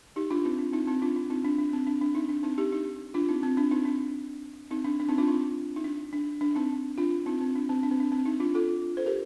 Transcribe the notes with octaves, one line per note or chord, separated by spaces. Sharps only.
D#4 G4
D4 F4
C4 D#4
D4
C4 D#4
C4 D#4
D4 F4
D4
C4 D#4
D4
D4
C4
D4
D4
C4 D#4
D4
C4 D#4
D#4 G4
D#4 G4
D4 F4
C4 D#4
C4
D4
C4 D#4
D4
C4 D#4
D4
D4
C4 D#4
D4 F4
C4 D#4
D#4
D4
D4
D4
C4 D#4
D4 F4
C4 D#4
C4
D4
C4
D4
C4
D4
C4
C4 D#4
D4 F4
F4 A4
A4 C5
G4 A#4